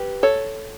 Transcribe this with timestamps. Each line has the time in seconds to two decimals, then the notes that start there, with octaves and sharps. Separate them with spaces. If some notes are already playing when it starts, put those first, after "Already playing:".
Already playing: G4 B4
0.23 A4 C#5